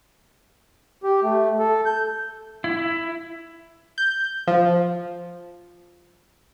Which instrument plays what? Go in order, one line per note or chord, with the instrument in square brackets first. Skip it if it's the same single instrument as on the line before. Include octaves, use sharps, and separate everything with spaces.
[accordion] G4
A3
A4
G6
[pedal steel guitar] E4
[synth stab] G6
F3